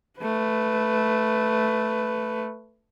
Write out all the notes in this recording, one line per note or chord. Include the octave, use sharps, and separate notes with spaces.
A3 B4